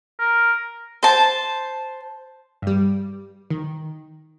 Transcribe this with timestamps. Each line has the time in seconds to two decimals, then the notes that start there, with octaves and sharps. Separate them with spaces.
0.20 A#4
1.03 C5 A5
2.62 G2 G3
3.50 D#3